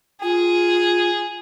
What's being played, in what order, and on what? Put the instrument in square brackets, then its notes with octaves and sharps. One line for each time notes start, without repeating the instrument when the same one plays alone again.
[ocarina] F4 [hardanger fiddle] G#4